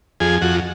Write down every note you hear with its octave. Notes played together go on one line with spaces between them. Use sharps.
F2 G#4
F2 F#4